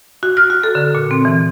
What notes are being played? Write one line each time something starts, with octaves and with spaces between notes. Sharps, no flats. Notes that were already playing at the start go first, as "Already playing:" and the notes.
F#4
F6
F#4
A4
D3
A#2
C4
E3